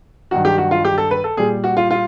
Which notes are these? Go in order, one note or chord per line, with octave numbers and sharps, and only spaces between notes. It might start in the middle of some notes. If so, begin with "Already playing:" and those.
G2 D#3 F#3 F#4
G4
F#4
F4
G4
A4
B4
A4
A#2 G3 G#4
F#4
F4
F4